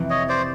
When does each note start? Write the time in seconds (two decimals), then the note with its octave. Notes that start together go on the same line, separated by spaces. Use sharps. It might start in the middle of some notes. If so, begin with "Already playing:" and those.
Already playing: F2 C3 E3
0.10 C#5 D#5
0.28 C5 D5